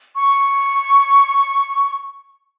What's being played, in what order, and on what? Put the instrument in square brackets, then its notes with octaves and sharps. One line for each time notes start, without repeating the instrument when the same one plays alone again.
[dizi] C#6